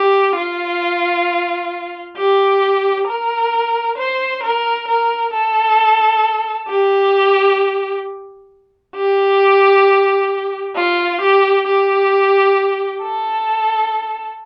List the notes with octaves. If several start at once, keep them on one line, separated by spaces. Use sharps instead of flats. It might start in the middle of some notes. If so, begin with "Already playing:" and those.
Already playing: G4
F4
G4
A#4
C5
A#4
A#4
A4
G4
G4
F4
G4
G4
A4